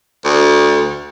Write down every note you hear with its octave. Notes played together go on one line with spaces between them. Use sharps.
D2